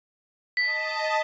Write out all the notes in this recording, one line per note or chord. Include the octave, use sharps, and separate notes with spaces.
D#5 A5 B6